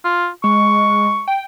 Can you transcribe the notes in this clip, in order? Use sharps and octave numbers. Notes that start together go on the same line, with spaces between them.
F4
G#3 C#6
G5